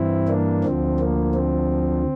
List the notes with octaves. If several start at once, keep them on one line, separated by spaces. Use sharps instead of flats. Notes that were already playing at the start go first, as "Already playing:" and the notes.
Already playing: G2 E3 C4 E4
A#3 D4
D2 D3 F3 C4
A#3
C4